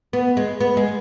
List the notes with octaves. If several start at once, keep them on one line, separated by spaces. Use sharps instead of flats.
B3
G#3
B3
G#3